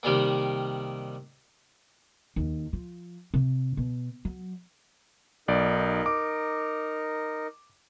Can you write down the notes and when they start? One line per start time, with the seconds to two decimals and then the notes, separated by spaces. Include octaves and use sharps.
0.03 C2 D#3 G3 A#3
2.36 D#2
2.73 F3
3.34 C3
3.77 B2
4.25 F#3
5.48 B1 D#4 A#4 D5
6.06 D6